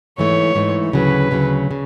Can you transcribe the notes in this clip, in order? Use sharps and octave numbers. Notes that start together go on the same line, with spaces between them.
G#2 E3 A3 C#5
G#2 E3 A3
D2 C#3 F#3 B4
D2 C#3 F#3
C#3